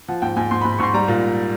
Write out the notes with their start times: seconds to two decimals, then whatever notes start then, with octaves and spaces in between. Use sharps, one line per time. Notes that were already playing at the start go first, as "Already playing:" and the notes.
0.08 F3 F#5
0.22 G#2 G5
0.36 G#2 G#5
0.51 G#2 C6
0.61 B5
0.65 G#2
0.73 B5
0.79 G#2 C6 C#6
0.94 G3 A#5
1.08 A#2